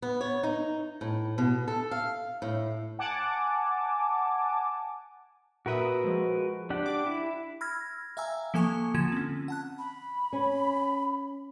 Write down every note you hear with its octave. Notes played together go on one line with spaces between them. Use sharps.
B3
C#5
D#4
A2
B2
A4
F5
A2
F#5 G#5 A5 D6
A#2 F#4 A#4 B4 E5 D#6
F3 G#3
D4 G4 F#5
D6
E4
B5 E6 F6 G#6 A#6
E5 F5 G5 G#5 A#5 E6
F3 A#3 A4 G#5 C#6
D3 F3 F4 G#6 E7
C4 C#4
F#5 A5 F#6
B5
C#4